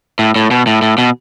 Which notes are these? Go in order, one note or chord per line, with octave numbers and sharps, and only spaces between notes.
A2
A2
B2
A2
A2
B2